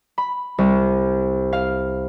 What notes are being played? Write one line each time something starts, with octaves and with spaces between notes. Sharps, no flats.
B5
C2
F5